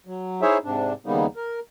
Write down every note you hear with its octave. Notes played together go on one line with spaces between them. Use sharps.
F#3
D#4 E4 G#4 C5 C#5 E5
G#2 C3 D4
D#2 C#3 G3 A#3 B3 D#4
A#4